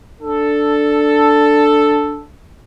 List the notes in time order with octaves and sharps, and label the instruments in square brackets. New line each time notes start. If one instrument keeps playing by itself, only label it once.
[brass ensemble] D4 A4